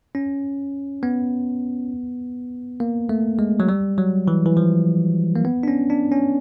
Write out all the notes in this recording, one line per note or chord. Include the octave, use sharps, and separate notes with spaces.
C#4
B3
A#3
A3
G#3
F#3
G3
F#3
E3
E3
F3
A#3
B3
D4
C#4
D4
C#4